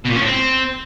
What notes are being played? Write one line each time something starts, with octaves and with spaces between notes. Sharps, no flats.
B2
A#2
C#4
A2
C4